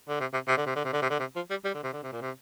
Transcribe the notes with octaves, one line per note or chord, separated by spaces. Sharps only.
D3
C3
C3
C3
D3
C3
D3
C3
D3
C3
D3
C3
F3
G3
G3
D3
C3
D3
C3
A#2
C3